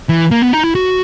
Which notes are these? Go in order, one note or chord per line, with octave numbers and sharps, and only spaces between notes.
E3
A#3
B3
D#4
E4
F#4